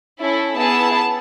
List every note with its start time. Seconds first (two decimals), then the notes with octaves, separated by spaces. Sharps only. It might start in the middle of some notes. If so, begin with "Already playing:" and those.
0.20 C#4 E4 A4
0.56 B3 E4 G#4 A5